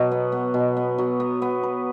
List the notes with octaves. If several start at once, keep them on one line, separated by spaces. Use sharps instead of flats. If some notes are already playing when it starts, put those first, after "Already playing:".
Already playing: B2 F#3
B3
B3
B2
B3
F#3
B3
B3
B4